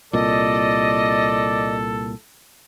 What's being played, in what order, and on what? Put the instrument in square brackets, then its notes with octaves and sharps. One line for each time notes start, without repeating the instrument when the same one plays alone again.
[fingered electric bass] C2 A#2 [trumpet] A4 [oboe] D5 [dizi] D#5